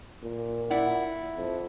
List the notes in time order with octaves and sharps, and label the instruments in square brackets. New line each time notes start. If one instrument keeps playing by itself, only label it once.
[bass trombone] A#2
[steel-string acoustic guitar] E4 D5 F#5
[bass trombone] F2